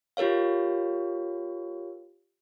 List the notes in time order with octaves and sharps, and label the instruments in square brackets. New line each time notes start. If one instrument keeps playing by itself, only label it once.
[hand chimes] F4 G4 A#4 C#5 F5